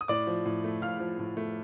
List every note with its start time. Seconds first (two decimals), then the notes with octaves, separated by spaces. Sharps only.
0.01 D#6
0.08 A2 D5 D6
0.27 F3
0.45 A2
0.64 A3
0.82 A2 F5 F6
1.00 F3
1.19 A2
1.37 A3